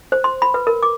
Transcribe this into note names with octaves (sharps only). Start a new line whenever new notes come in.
C5
C6
B5
B4
A#4
D6